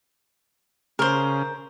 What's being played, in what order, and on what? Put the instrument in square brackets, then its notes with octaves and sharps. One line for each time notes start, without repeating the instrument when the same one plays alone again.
[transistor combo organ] C#3 [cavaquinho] A#4 C5